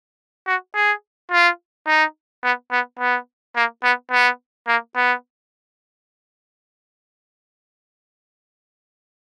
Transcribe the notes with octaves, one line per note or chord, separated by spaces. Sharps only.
F#4
G#4
F4
D#4
B3
B3
B3
A#3
B3
B3
A#3
B3